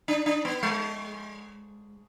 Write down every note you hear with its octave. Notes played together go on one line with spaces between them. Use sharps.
D4
D4
B3
G#3